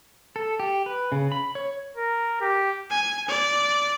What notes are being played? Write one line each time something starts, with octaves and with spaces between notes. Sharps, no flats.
A4
G4
B4
C#3
B5
C#5
A#4
G4
G#5
D5